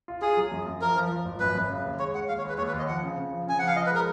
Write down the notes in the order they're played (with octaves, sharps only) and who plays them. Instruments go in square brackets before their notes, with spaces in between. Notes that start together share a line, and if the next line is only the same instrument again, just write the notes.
[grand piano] F4
[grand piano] F4 [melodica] G#4
[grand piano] F#3
F#2
F#2
[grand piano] F3 [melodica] A#4
[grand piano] F3
F3
G#1
[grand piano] F#2 [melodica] B4
[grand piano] F#2
C#3
D#2
[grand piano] G#3 [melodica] C#5
[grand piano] G#3 [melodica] F#5
[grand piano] D#2 [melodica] F5
[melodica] C#5
[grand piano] G#3 [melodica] B4
[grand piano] D#2 [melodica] C#5
[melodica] B4
[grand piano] D#2
[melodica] D#5
[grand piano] F3 [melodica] F#5
[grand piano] C#3
C#3
F3
[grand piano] C#3 [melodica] G#5
[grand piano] F3 [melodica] F#5
[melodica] F5
[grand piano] F3 [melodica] D#5
[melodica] B4
[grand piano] G#3 [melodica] A#4